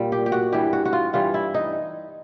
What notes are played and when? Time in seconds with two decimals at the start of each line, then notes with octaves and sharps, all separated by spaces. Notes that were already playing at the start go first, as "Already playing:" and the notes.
Already playing: A#2 G3
0.12 G4
0.26 G4
0.32 F#4
0.52 G2 E3 G3 G4
0.73 F#4
0.85 F#4
0.93 F4
1.13 G2 E3 G3 F4
1.34 E4
1.54 D#4